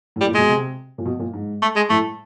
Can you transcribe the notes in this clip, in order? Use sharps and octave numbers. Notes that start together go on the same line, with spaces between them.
A2 G3
A#2
B2 G#3
C3
A#2
B2
A#2
G#2
A3
G#3
A2 A3